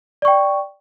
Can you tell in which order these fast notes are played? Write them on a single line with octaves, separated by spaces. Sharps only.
D5 C#6 G5